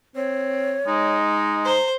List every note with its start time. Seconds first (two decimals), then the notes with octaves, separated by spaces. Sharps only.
0.16 C4 C#5
0.87 G#3 D#4
1.65 C5 A#5